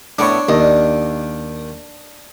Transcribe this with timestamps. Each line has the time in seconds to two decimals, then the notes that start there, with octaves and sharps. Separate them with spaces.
0.19 A2 A3 B3 D4 C#5
0.49 D#2 D4 D#5